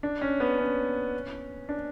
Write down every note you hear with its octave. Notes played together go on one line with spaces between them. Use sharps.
D4
C#4
B3
C#4
D4